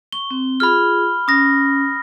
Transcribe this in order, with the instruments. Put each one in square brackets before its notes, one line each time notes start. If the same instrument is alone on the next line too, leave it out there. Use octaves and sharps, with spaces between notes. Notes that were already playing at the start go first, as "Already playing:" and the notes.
[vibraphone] C#6 [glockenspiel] G7
[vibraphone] C4
[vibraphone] F4 G#4 [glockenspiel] B5 F6
[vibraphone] C#4 [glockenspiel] D#6 A#6